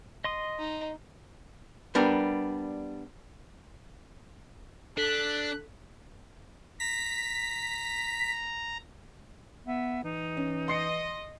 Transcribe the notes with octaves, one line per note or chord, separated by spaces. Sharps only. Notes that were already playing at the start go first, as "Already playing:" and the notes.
D#5 C6 D#6
D#4
G3 B3 D4 A#4
D4 A4 F#6 B6
A#5 B6
B3 E5
E3 D#4
C#4
D#5 C6 C7 C#7